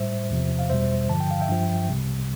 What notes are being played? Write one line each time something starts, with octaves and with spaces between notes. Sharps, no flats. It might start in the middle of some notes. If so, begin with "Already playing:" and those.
Already playing: A2 G3 C5 E5
E2 C3 F3
F5
E2 B2 G3 C5 E5
G2 D3 F3 A5
G5
F5
E5 G5
G2 F3
C2 C3 G3